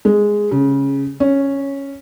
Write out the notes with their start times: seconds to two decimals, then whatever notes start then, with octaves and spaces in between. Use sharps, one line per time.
0.05 G#3
0.51 C#3
1.20 C#4